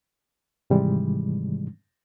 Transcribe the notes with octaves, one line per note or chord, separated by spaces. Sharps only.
G#2 C3 D#3 E3 G3 G#3